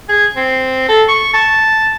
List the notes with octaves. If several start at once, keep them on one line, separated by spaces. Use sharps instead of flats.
G#4
C4
A4
C#6
A5